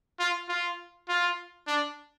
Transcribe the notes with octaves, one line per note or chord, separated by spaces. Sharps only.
F4
F4
F4
D4